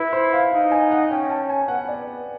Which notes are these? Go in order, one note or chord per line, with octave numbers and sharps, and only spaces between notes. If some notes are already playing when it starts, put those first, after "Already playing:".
Already playing: E4 B4
C5
F5
D#4 F5
G#5
F#5
C#4 G5
A5
G#5
B3 F#5
D5